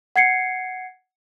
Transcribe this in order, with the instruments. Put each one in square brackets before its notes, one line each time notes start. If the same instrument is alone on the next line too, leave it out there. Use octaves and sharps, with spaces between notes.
[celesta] F#5 G#6 C7 C#7